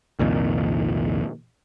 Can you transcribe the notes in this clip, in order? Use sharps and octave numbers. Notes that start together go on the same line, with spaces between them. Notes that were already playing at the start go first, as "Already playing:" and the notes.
C2 F2 A#2 D#3